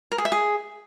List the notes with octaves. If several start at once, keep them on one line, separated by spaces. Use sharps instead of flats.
A#4
G#4
E5
G#4